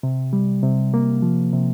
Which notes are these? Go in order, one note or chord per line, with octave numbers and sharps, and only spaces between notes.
C3
G3
C3
A#3
F3
C3